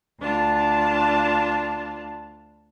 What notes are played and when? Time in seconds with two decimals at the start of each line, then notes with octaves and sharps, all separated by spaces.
0.20 D2 D4 F4 A5